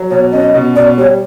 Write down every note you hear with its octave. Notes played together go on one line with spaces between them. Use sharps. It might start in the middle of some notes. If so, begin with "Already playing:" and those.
Already playing: F#3
B2 C#5
C#4 D#5
B2
B2 D5
G3 C#5